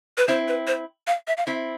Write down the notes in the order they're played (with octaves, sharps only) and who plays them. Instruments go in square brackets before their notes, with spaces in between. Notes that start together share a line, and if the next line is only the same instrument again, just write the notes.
[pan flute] B4
[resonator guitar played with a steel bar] C4 E4 [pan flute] C5
[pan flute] B4
C5
F5
E5
F5
[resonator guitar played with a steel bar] C4 E4 [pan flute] E5